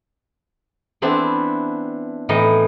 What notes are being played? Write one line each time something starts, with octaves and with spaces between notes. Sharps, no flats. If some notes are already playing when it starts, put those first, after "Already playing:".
E3 B3 C4 D4 E4
A2 E3 D#4 D#5